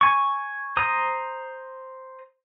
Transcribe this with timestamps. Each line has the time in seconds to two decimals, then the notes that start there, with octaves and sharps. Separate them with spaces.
0.01 G#5 C#6
0.77 C5 A#5 D#6